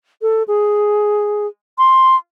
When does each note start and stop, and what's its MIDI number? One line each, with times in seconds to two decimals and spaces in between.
0.22 0.43 69
0.48 1.47 68
1.78 2.15 84